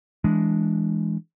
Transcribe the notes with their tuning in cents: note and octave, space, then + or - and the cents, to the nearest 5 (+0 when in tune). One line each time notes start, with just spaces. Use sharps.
E3 +0 G#3 +0 D4 -5